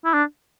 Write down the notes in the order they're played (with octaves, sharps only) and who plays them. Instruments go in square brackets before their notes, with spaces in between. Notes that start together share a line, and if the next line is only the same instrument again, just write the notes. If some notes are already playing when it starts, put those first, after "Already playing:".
[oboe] E4
D4